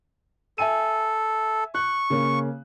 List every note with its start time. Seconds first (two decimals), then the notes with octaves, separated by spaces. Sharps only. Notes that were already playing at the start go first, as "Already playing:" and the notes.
0.58 A4 E5 G#5 D#7
1.75 C#6 F#6
2.10 C#3 A#3 C#4